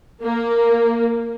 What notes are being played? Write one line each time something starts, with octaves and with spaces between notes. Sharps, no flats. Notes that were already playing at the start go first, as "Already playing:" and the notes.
A#3